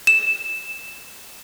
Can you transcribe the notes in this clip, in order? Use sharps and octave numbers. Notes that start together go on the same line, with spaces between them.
E7